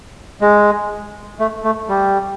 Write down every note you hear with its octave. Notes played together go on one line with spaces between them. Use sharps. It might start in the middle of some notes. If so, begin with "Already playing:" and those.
G#3
A3
A3
G3